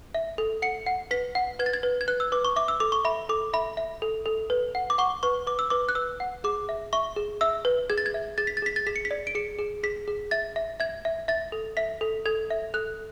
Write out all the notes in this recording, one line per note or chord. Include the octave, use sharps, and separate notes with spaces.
E5
A4
F#5 C#7
F#5
B4 B6
F#5
B4 G#6
A6
G#6
B4
G#6
B4 F#6
E6
B4 D6
C#6
E5 D6
E6
A4 D6
C#6
E5 B5
A4 D6
E5 B5
E5
A4
A4
B4
F#5
D6
F#5 C#6
B4 C#6
B4 D6
E6
B4 D6
F#6
B4 E6
F#5
G#4 D6
E5
E5 C#6
G#4
E5 E6
B4
G#4 G#6
A6
G#6
E5
G#4 A6
B6
A6
G#4 B6
A6
G#4 B6
C#7
B6
D5
D7
G#4 C#7
G#4
G#4 B6
G#4
E5 A6
E5
E5 G#6
E5
E5 A6
A4
E5 B6
A4
A4 G#6
E5
A4 F#6